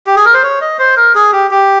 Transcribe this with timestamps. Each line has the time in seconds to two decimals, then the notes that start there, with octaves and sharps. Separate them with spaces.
0.06 G4
0.16 G#4
0.25 A#4
0.33 C5
0.43 C#5
0.61 D#5
0.79 C5
0.97 A#4
1.15 G#4
1.32 G4
1.51 G4